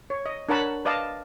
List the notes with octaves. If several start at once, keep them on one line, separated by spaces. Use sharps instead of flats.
C#5
D#5
D4 A#4 C#5 F#5 A5 B5
B4 D5 D#5 F5 A5